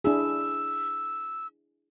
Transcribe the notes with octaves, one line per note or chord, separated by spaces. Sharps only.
D4 E4 G#4 E6